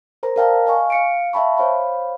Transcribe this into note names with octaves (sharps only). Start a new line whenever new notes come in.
A#4 C5 A#5
A#4 D5 F5 G5 A5 A#5
D#5 F5 G#5 C#6
F5 C#7 D7
E5 F5 G5 A5 B5 C#6
C5 C#5 F5 B5